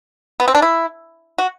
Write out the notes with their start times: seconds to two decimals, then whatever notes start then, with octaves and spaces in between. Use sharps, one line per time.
0.40 B3
0.48 C4
0.55 D4
0.62 E4
1.38 F#4